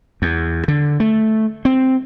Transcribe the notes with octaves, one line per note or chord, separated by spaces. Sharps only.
E2
D3
A3
C4